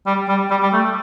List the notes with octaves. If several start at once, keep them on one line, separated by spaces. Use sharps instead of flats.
G3
G3
G3
G3
A3